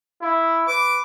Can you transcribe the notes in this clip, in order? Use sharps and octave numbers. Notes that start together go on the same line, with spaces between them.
E4
B4 D6